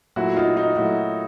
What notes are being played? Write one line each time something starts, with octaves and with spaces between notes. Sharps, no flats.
A#2 F#3 A3 E4 F#4
D#4 F4
D#4 F4
A#2 F#3 A3 E4 F#4